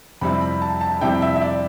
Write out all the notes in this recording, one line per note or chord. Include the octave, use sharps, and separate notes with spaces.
F2 C3 G3 C4 E4 B5
B5
A5
A5
F2 C3 G3 C4 E4 G5
E5
E5
D5